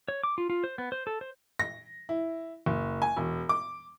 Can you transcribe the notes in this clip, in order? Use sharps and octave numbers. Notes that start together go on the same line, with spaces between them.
C#5
D6
F4
F4
C5
B3
C5
A4
C5
A#6
E4
F#1
G#5
E1
D6